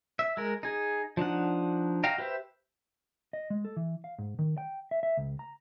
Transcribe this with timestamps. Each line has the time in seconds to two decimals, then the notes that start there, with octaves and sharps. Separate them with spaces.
0.19 E5
0.37 G#3 A#4
0.63 D#4 G#4
1.17 F3 D4 D#4 F#5
2.04 F#4 D#5 F5 G5 A#5
2.18 G4 B4 C5 E5
3.33 D#5
3.50 G#3
3.65 A4
3.77 E3
4.04 F5
4.19 G#2
4.39 D#3
4.58 G5
4.91 E5
5.03 E5
5.17 C#2
5.39 A#5